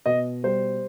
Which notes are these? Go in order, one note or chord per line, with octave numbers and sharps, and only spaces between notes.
B2 D#5
G3 C5